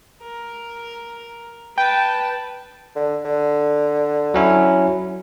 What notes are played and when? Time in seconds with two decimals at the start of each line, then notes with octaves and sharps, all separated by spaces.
0.22 A#4
1.78 B4 G5 A5
2.96 D3
3.25 D3
4.34 F#3 C#4 E4